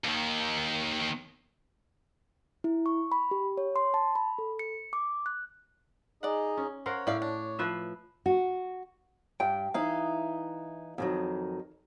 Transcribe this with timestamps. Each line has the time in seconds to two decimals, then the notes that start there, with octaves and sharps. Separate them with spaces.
0.04 D#2 D#3
2.64 E4
2.86 C#6
3.12 B5
3.31 G4
3.57 C#5
3.76 C6
3.94 A5
4.15 B5
4.38 A4
4.59 C#7
4.93 D6
5.26 F#6
6.23 D#4 G#4 D5 D#5 F#5
6.57 C#4
6.86 A#4 C5 C#5 F5 F#5
7.07 A2 D5 E5 F5
7.22 D4
7.59 F3 B4 E5
8.26 F#4
9.40 G2 G5
9.74 E3 D#4 F5
10.98 F2 D#3 F#3